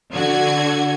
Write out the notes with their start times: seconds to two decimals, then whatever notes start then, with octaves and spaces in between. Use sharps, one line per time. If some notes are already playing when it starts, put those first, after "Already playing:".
0.13 D3 F#4 G#6